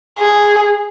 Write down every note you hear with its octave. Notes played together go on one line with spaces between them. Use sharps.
G#4